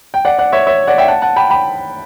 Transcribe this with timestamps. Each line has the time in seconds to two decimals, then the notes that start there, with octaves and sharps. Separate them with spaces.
0.14 G5
0.25 D5 F#5
0.39 D5 F#5
0.52 C#5 E5
0.67 C#5 E5
0.87 D5 F#5
0.98 E5 G5
1.08 F#5 A5
1.22 F#5 A5
1.36 G5 B5
1.50 G5 B5